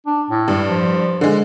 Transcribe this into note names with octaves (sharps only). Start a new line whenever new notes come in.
D4
A2
G2
F3
D3 G#3